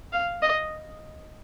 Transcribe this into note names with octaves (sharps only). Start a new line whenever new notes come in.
F5
D#5